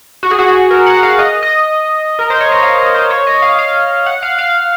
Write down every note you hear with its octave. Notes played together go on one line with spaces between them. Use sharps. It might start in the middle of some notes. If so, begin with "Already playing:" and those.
F#4
G#4
F#4
A#4
F#5
F5
D#5
D#5
A#4
C5
C#5
D#5
F5
D#5
C5
C#5
D#5
F5
F5
F#5
F5
F5